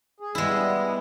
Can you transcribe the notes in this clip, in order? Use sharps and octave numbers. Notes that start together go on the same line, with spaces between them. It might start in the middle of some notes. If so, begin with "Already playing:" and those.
G#4
G3 G#3 B3 E4